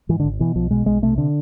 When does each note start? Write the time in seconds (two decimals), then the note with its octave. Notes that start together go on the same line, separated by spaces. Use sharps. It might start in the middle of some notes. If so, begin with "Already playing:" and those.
0.09 G#2 E3
0.20 D3
0.24 G#1
0.39 B2 E3
0.55 B1 F3
0.71 B2 G#3
0.86 B1 G#3
1.02 C3 A3
1.18 D3